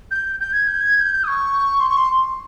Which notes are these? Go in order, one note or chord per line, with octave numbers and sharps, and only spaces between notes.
G6
G6
G#6
G6
G#6
G#6
G6
D#6
C#6
C6
C#6
C6